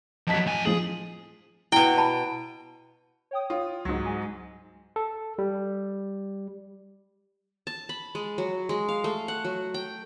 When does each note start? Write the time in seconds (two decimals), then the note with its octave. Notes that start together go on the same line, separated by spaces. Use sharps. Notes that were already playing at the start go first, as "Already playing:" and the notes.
0.27 F2 F#3 D#5 A5 B6
0.47 A2 G#5
0.66 F3 G#4 F#7
1.72 B2 E4 G5
1.97 A5 B5
3.31 C#5 G5 D#6
3.50 F4
3.85 C#2 G#2 F#3
4.05 G#3 G#5
4.96 A4
5.39 G3
7.67 A5
7.89 B5
8.15 G#3
8.38 F#3
8.69 G#3
8.88 F5
9.04 A3
9.28 F#5
9.45 F#3
9.74 G5